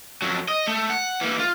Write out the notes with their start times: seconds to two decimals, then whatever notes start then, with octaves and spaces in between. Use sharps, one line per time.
0.22 F2 F#3
0.48 D#5
0.68 A3
0.90 F#5
1.21 E3 A#3
1.40 F4